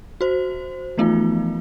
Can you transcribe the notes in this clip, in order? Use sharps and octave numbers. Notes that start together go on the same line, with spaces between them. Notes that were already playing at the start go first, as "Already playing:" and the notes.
F#4 C5
E3 F3 A3 B3 D#4 F4